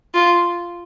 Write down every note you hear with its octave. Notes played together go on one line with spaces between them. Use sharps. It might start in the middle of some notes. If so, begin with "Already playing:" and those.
F4